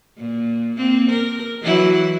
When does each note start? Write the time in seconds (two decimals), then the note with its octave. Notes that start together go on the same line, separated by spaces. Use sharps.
0.18 A#2
0.76 A#3 C4
1.10 A#4
1.62 E3 F#3 E4